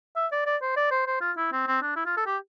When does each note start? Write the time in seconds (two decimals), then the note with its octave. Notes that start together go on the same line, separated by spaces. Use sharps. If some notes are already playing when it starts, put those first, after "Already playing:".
0.16 E5
0.32 D5
0.46 D5
0.62 C5
0.76 D5
0.91 C5
1.07 C5
1.21 F4
1.37 E4
1.52 C4
1.67 C4
1.82 D4
1.96 E4
2.06 F4
2.17 A4
2.26 G4